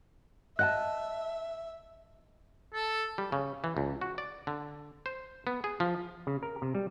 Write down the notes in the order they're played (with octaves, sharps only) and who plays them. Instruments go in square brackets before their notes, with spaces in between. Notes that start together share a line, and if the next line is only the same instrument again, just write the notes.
[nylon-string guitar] D#5 F#5 A5 [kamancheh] E5 [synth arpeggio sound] F#6
[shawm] A4
[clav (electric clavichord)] G3
C#3
E3
C#2
F#4
D5
D3
C5
B3
G#4
F3
C#3
A#4
C3
G3